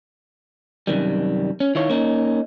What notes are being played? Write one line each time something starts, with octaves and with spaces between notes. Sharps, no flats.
F#2 C3 D#3 G3
C#4
D#3 E4 F4 C#5
A#3 C#4 D#4